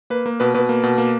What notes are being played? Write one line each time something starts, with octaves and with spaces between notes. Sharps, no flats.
A#3 B4
A#3
B2 B4
B2 B4
A#3
B2
A#3